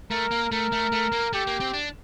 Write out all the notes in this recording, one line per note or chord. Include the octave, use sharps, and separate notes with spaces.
A3 A#4
A#3
A3 A#4
A3
A3
A#3
A3 G4
A#3
C4
D4